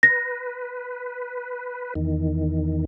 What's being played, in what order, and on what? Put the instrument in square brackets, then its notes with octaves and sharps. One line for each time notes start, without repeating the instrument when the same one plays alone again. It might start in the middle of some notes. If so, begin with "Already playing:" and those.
[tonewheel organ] B4 [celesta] A#6
[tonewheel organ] E2 D#3